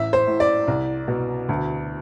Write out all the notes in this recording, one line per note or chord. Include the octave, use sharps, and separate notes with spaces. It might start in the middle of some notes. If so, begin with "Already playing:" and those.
Already playing: A1 E5
C5
A2
D5
C2
B2
D2